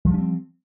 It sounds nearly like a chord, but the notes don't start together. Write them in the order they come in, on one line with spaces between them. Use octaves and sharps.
F3 G3 C#4 C4